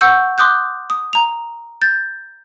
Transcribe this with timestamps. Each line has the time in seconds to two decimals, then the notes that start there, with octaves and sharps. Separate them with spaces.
0.01 F#5 C#6 E6 G6
0.38 C6 D6 D#6 F#6 G6
0.90 D#6
1.13 A#5 F7
1.82 G6 A6